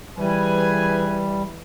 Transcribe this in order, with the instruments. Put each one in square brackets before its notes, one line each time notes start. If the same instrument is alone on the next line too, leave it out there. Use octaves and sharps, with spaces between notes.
[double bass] E3 [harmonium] G3 [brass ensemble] G#4 B4 G#5